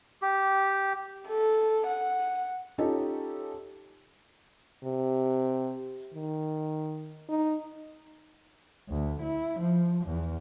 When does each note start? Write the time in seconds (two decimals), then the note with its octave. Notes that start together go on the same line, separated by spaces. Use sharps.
0.22 G4
1.28 A4
1.87 F#5
2.78 C#4 D#4 F4 G4 A4
4.84 C3
6.14 D#3
7.29 D#4
8.89 D2
9.22 E4
9.60 F3
10.07 E2